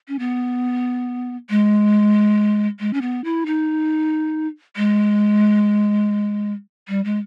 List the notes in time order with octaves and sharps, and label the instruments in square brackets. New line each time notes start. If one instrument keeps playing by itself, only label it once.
[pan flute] C#4
B3
G#3
G#3
C#4
B3
E4
D#4
G#3
G3
G#3